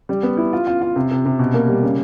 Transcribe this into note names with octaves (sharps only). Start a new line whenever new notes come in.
G3
B3
E4
F4
F4
F4
C3
C3
C3
B2
A#3
G3
C#3